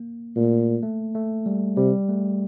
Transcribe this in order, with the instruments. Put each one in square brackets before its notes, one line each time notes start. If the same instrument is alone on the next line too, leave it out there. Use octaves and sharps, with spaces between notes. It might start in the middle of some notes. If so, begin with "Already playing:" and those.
Already playing: [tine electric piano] A#3
[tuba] A#2 [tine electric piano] A3
[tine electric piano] A3
A3
G3
[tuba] C3 [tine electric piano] G3
[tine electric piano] A3